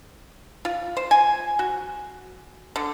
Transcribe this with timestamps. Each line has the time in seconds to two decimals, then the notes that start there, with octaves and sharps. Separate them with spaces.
0.65 F4
0.97 C5
1.11 G#5
1.59 F#4
2.76 D3